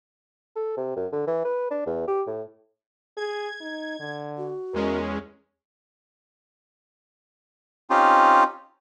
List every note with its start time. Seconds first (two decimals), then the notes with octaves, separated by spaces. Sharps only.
0.56 A4
0.77 C3
0.97 F#2
1.13 D3
1.27 E3
1.45 B4
1.71 D4
1.86 E2
2.08 G4
2.27 A2
3.17 G#4 G#6
3.61 D#4
4.00 D3
4.38 F#4
4.74 E2 G#3 C#4 A#4
7.90 C4 C#4 D#4 F4 G4